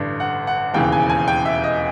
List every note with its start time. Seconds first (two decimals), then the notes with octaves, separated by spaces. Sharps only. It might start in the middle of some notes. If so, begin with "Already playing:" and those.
Already playing: A1 G2 D3
0.20 F#5
0.47 F#5
0.74 E1 D#2 C#3 E3 G5
0.92 G#5
1.10 G#5
1.28 G5
1.45 E5
1.64 D#5